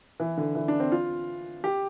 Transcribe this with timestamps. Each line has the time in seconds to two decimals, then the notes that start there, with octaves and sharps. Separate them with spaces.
0.20 E3
0.38 D3
0.55 E3
0.68 D4
0.80 C4
0.92 F4
1.64 G4